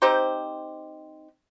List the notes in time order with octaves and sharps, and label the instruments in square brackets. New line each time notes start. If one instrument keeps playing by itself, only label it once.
[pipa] C4 D#4 G4 C5